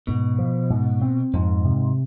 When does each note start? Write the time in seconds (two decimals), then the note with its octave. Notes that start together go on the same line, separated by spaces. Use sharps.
0.07 G#2 B2
0.39 F3
0.70 G#2
1.01 C4
1.33 F2 G#2
1.64 C3